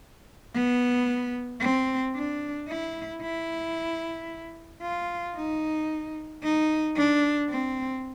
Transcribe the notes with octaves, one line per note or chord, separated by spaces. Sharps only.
B3
C4
D4
E4
E4
F4
D#4
D#4
D4
C4